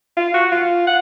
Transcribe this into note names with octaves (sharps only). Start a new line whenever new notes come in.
F4
F#4
F4
F#5